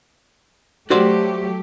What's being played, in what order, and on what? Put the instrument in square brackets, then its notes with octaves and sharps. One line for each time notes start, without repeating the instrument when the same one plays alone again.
[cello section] F#3 A3 G4 [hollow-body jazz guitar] F#4 C5 D5